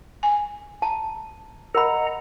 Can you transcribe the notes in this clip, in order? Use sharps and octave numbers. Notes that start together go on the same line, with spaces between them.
G#5
A5 A#5
A#4 D#5 F#5 A#5 B5